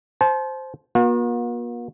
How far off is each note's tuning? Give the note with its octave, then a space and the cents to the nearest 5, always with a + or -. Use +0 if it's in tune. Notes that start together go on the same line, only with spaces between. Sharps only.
C5 +0 A5 -35
A#3 +45 F#4 -45